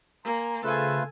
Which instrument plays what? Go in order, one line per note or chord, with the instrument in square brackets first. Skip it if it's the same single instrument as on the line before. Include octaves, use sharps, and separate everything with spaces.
[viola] A#3 [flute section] G#5 A#5 C6
[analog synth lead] C#3 [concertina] A3 F4 B4 [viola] A4 G#5 [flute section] C5 F5